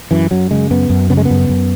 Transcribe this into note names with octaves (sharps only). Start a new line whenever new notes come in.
F#2 E3
F#2 F#3
C#3 G#3
F#2 B3
F#2
C#3 B3
G#3
B3
F#2
F#2